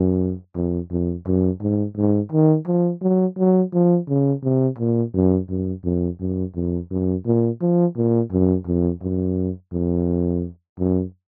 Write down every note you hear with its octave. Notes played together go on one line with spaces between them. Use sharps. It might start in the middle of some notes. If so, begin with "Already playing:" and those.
Already playing: F#2
F2
F2
F#2
G#2
G#2
D#3
F3
F#3
F#3
F3
C#3
C3
A#2
F#2
F#2
F2
F#2
F2
F#2
A#2
F3
A#2
F#2
F2
F#2
F2
F#2